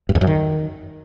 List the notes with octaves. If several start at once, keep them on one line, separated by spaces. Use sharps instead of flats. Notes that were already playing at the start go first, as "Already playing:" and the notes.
G2
E2
F#2
D#3